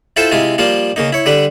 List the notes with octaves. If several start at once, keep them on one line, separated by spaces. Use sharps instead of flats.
E4 F4 A4 C5 G5
C3 G#3 E4 F4
F3 G3 A#3 F4
C#3 A#3 D#4
E4 C#5
D3 G3 B4